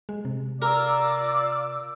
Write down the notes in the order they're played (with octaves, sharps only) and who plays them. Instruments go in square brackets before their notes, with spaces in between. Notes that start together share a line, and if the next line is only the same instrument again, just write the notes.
[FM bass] G#3
C3
[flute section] F4 D6 E6 [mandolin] A#4 [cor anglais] D5